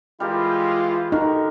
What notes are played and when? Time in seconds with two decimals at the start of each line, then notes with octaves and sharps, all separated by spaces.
0.20 E3 G3 G#3 F4 G4 A#4
1.12 D3 D#4 F#4 A#4